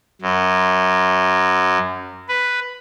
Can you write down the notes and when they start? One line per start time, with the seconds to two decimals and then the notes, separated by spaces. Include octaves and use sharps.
0.21 F#2
2.28 B4